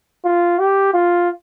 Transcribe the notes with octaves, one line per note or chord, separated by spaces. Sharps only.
F4
G4
F4